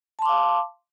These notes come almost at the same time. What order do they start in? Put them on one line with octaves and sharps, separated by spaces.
A5 C6 D6 F5